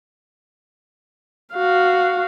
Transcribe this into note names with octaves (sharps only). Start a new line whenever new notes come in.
F#4 F5